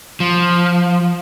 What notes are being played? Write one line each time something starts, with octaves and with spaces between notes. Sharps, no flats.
F3